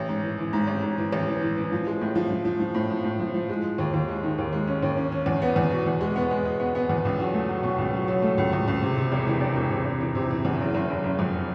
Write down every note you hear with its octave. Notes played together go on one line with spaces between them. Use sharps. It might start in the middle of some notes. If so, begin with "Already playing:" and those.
Already playing: A1
G#2
E3
E3
G#2
A1
G#2
E3
A1
E3
E3
E3
F3
G#3
A2
F3
F3
F3
F3
A2
F3
A2
F3
F3
G#3
G#3
D#2
D#2
G#3
D#3
D#2
G#3
C#4
D#2
C#4
C#4
E2
B3
E2
B2
E2
G#3
B3
G#3
G#3
B3
B3
E2
C#2
F#3
A3
F#3
B2
C#2
F#3
F#3
A3
C#2
C#2
C#2
C3
C3
E1
E3
E1
E1
C3
E1
E3
C3
E3
E2
F#1
F#1
F#1
F#1
F2